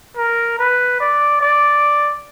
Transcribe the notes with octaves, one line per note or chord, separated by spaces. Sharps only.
A#4
B4
D5
D5